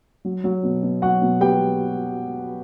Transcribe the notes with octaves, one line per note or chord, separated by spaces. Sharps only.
F#3
F#3
B2
B2
F#3 F#4 F#5
B2
B3 G4 G5